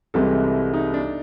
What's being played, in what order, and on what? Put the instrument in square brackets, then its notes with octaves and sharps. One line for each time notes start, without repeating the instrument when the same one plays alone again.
[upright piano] C2 C3 E3 G#3 [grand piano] A4
[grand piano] E4
D#4
D4